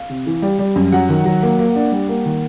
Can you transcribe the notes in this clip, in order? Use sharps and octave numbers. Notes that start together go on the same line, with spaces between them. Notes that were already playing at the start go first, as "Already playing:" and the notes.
Already playing: F5
C3
E3
G3
G3
F#2
F#3 F#5
D#3
F#3
A#3
A#3
D4
G3
A#3
D#3